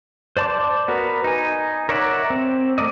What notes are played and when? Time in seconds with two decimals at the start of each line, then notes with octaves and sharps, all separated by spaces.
0.37 C5 D5 A5 C6 D6
0.88 B3 F#4 A#4 B4
1.24 D#4 G#5
1.89 A#4 C#5 D5 E5 F#5
2.30 C4
2.78 A3 A#4 D5 D#5